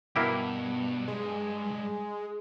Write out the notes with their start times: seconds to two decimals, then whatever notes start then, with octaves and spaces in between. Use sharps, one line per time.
0.16 G2 B2 A#3 E4 G4
1.08 G#3